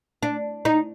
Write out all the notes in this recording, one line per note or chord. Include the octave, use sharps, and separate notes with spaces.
D4
D#4